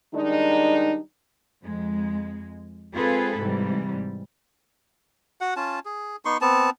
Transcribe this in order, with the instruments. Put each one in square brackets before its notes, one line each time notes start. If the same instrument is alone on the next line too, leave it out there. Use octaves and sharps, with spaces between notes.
[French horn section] D#3 G3 G#3 D4 D#4
[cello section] F2 G#3
G#3 C4 F4 G#4 A4 B4
G#2 C3 E3 G3
[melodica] F#4 F#5
C#4 F4 A5
G#4
B3 D#4 C6 C#6
B3 C4 A5